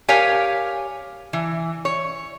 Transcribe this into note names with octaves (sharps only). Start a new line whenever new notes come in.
G4 A#4 C#5 F5 G#5
E3
C#5